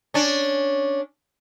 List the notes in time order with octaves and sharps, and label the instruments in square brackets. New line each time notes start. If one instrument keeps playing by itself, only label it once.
[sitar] C#4 D4